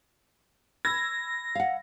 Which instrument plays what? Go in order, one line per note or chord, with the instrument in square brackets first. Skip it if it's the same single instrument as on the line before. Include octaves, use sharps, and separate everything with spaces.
[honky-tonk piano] B5 E6 G#6 [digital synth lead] A#6
[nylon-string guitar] F5 F#5